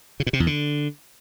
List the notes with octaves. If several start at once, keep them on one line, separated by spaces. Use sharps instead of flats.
C#3
A#2
C3
E2
D3